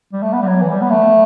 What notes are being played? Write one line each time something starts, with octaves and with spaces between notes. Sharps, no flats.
G3
A3
B3
G3
F#3
E3
G3
B3
A3